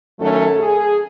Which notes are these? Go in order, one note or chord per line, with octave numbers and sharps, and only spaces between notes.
F#2 D#3 F#3 A3 C#4 A4
G#4